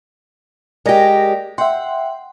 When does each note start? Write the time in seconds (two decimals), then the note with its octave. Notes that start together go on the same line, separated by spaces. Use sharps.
0.86 G#3 G4 A#4 D5 A#6
1.58 E5 F#5 G5 C6